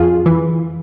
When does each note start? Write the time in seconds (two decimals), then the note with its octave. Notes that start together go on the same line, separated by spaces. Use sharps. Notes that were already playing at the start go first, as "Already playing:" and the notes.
Already playing: F2 F4 G#4
0.26 E3